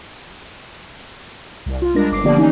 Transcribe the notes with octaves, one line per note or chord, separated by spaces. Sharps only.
C2
F4
G3 G#3 D4 A#4 A#6
G1 D6 C7
D3 F3 A#3 B3 G4 D5
E3 C#4 D#4